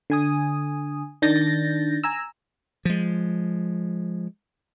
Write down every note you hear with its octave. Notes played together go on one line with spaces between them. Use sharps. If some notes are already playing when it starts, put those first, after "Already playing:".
D3 G#5 D#6
D#3 D4 G6 A6 A#6
G#5 A#5 E6
F3 G#3